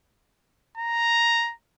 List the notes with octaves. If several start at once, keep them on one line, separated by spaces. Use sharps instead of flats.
A#5